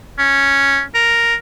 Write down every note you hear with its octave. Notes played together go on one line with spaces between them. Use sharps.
C#4
A#4